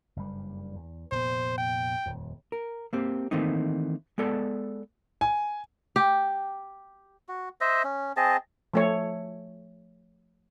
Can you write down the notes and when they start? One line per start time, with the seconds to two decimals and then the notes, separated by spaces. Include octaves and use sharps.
0.16 F#1 G2 G3
0.76 E2
1.12 F1 A#2 B3 C5
1.58 G5
2.06 D#1 F2
2.52 A#4
2.93 A#3 C4 G4
3.31 D#3 E3 A3 A#3 C4 D#4
4.18 G#3 B3 A4 D5 A5
5.21 G#5
5.96 G4
7.28 F#4
7.61 C5 D#5 E5
7.84 C#4
8.17 C4 G#4 D#5 A5
8.74 F3 A3 C#5